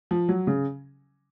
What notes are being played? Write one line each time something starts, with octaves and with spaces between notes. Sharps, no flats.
F3
F#3
C#3